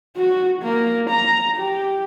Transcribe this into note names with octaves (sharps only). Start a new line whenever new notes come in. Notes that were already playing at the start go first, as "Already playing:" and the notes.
F#4
A#3
A#5
G4